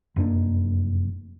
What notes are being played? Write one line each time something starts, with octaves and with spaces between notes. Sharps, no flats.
F1 F#2 A#3 D4